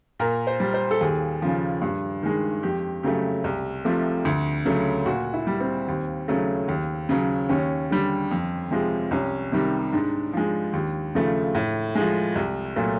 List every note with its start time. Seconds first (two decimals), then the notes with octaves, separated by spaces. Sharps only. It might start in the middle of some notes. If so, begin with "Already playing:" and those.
0.19 A#2 A#4
0.47 C5
0.60 G3
0.74 C5
0.91 A4
1.00 D#2 G#4
1.42 C#3 F3
1.82 G2
2.23 D#3 G#3
2.63 F2 G4
3.03 C#3 F#3 A3 G4
3.44 C2
3.85 C3 F3 A3
4.25 D2
4.65 C#3 F#3 A3
5.06 A#2 F#4
5.33 E4
5.47 G3
5.60 C4
5.88 D#2
6.28 C#3 F#3 A3
6.68 D#2
7.09 C#3 F#3
7.49 D#2 C#4
7.90 D3 G3
8.31 F2
8.71 C3 F3 G#3
9.11 C2 C#4
9.52 C3 D#3 G3
9.93 G#2 D4
10.33 F3 G#3
10.73 D#2
11.15 C#3 F3 A3
11.55 A2
11.95 F3 G#3
12.35 C2
12.76 A#2 F#3 A3